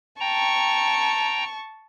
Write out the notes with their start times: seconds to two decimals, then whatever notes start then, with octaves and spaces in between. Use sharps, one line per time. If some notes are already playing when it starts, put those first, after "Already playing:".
0.20 G5 A5 A#5 C#6